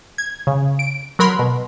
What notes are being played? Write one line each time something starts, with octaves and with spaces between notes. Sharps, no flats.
G#6
C#3
D7
F#3 A#4 B5 C6
B2